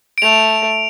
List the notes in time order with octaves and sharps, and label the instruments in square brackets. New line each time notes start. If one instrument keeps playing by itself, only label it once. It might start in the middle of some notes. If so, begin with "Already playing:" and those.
[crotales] D7
[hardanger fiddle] A3 [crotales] F7